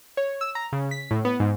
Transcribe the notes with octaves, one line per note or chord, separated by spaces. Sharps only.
C#5
E6
A#5
C#3
B6
A2
B3
G#2